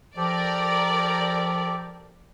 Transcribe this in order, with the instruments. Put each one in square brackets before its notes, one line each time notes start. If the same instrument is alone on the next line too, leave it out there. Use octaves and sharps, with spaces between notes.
[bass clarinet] F3 [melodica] G4 A4 [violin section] A#4 D5